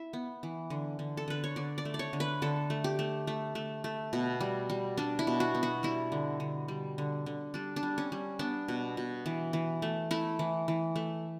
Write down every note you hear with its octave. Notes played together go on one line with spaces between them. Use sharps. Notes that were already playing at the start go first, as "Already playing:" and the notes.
Already playing: E4 E5
B3
E3
D3
D3
A4
D3 B4
C#5
D3 D5
D5
A3
D5
C#5
D3
B4
D3 A4
A3
G4
A3
A3
A3
A3
B2
G3
G3
G3 D4
E4
B2
F#4
B3
F#4
G3 E4
D3
D3
G3
D3
D3
G3 D4
D4
G3
C#4
G3
B3 D4
B2
B2
E3
E3
A3
A3 E4
E3
E3
A3